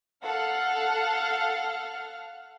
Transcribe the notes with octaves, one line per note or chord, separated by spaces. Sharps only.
A4 F5 F#5 F6